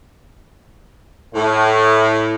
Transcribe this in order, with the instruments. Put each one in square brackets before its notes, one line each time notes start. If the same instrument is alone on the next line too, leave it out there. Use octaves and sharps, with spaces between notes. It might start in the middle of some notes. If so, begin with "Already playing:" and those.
[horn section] A2